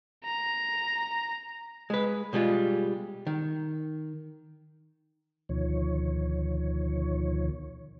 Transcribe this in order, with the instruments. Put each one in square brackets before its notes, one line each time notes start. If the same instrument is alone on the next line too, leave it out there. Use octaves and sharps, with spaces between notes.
[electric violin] A#5
[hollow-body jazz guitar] G#3 B4
B2 G3 G#3 F4
D#3
[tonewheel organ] D2 B2 D#3 F3 C#5